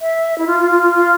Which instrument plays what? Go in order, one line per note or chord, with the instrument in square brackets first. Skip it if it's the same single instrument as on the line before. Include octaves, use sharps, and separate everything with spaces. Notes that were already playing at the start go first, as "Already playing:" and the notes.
[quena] E5
E4
F4
F4
F4
F4
F4